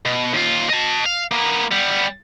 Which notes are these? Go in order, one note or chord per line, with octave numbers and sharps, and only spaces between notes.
B2
D#2 F4
D#5 A5
F5
A#3 B3
G3 B3